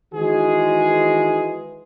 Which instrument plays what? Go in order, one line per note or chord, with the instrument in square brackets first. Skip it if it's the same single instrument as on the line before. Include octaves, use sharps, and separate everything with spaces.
[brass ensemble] D#3 E3 G#3 F#4 G#4